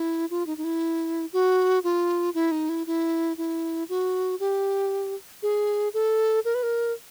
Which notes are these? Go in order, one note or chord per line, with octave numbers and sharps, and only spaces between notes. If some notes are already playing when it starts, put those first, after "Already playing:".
Already playing: E4
F4
D#4
D#4
E4
F#4
F4
E4
D#4
E4
E4
E4
F#4
G4
G#4
A4
A#4
B4
A#4